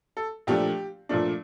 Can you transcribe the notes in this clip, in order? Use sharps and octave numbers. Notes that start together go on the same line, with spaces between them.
A4
A#2 F3 A3 D4 G4
A#2 F3 A3 D4